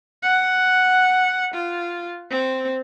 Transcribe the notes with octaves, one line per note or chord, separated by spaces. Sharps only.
F#5
F4
C4